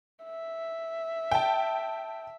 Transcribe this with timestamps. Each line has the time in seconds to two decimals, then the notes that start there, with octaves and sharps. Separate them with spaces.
0.24 E5
1.31 G5 A5